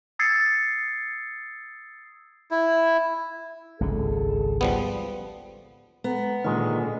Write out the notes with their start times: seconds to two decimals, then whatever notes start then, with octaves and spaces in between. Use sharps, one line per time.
0.19 D#6 E6 G#6 A6 C7 C#7
2.51 E4
3.80 G#1 C#2 D3 G#4 A4
4.61 F3 G3 B3
6.04 G#3 B3 A4 A#5
6.44 A#2 D3 D#3 G#3 F4